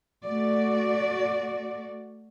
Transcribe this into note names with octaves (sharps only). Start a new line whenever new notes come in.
A3 F#4 D5